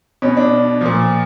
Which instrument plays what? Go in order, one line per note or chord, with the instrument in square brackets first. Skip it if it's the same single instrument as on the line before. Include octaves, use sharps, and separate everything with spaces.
[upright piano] B2 C#4
D4
A#2 F3